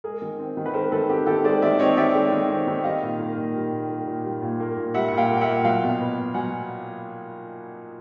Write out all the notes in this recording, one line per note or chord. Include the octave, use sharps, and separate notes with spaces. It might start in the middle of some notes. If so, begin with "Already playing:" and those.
G#3 G#4 A#4
D#3
C4
D#3
B4
G#3 A#4 C5
D#3 A4 B4
C4 G4
D#3 G4 A4
G#3 C5 D5
D#3 D5 E5
C4 C#5 D#5
D#3 D5 E5
G#3
D#3
C4
D#3
G3 D#5 F5
A#2
A#3
A#2
G3
A#2
A#3
A#2
G3
A#2
A#3
A#2
G3 E5 F#5
A#2 F#5
F5 G5
A#3
G5
E5 F#5
A#2
F#3 F5 G5
B2
B3
B2
F#3 F#5 G#5